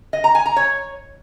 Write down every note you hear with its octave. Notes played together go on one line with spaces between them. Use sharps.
D#5
A#5
G#5
A#5
C#5